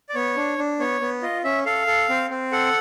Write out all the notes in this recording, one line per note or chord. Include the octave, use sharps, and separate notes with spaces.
D5
B3 C#5
D4
D4
B3 C#5
B3
F4 D#5
C#4 E5
A4 F5
A4
C4
C4
A4 F#5